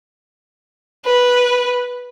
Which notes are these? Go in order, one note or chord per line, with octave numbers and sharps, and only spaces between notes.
B4